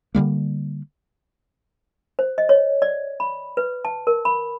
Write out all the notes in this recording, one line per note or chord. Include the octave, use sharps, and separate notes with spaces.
D3 F#3 G3 A#3
C5
D#5
C#5
D5
B5
B4
A5
A#4
B5